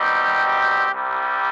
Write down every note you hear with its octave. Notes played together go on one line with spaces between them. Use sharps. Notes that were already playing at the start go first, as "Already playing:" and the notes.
Already playing: B2 G3 C4 D#4 G4
C2 C3 G3